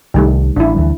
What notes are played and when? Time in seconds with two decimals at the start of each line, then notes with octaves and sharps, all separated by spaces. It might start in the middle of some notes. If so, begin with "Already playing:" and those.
0.14 C2 D#3 G3 A3
0.56 A1 D4 E4
0.74 D2 E3 G3